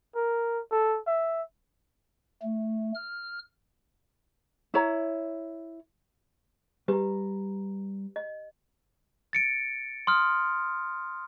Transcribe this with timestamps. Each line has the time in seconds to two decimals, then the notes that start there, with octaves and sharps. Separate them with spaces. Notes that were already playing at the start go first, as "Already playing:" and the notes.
0.15 A#4
0.71 A4
1.07 E5
2.43 A3
2.95 F6
4.74 E4 C#5 A#5
6.88 G3 G4 B4 A#5
8.16 D#5
9.33 A6 C#7 D7
10.07 C6 D#6 F6